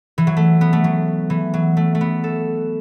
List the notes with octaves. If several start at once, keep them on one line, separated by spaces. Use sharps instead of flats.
E3
F#3
A3
B3
A3
F#3
E3
F#3
A3
A3
B3
A4